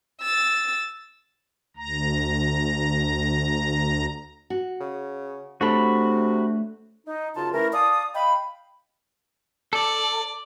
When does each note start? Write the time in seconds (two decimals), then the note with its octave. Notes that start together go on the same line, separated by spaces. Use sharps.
0.21 E6 A6
1.77 D2 A#5
4.50 F#4
4.80 C#3
5.61 C3 A3 D4 F#4 A4 C#5 B5
7.07 D#4
7.36 F#2 C#3 F4 G#4 A5
7.53 E3 A3 C#4 E4 A#4
7.73 D5 F5 A5 D#6
8.15 D#5 F5 G5 B5
9.73 A4 D5